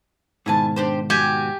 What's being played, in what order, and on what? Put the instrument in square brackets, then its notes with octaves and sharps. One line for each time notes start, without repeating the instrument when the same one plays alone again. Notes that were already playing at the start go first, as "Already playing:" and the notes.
[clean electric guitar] G#2 B2 D#3 [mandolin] E4 G#5 A5
[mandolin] D4 G4 C5
[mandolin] F#4 [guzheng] G4 G#5